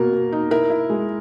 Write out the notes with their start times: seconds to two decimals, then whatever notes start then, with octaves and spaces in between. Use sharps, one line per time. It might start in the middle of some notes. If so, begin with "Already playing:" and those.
Already playing: B2 A#3 A#4
0.13 B2
0.33 D#4
0.51 E4 A#4
0.70 E4
0.90 G#3